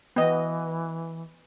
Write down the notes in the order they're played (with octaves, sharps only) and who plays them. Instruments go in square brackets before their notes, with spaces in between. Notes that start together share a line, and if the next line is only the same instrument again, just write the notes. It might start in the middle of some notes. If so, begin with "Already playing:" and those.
[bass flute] E3 [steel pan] B3 D#5